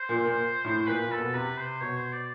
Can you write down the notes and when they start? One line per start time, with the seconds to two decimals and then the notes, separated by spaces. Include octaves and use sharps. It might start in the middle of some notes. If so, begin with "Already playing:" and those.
Already playing: C5
0.09 A#2
0.25 A#2
0.64 A2
0.87 A#2 B4
1.04 A#2
1.11 A4
1.19 B2
1.34 C3 B4
1.58 C5
1.81 B2 C#5
1.97 C5
2.12 D5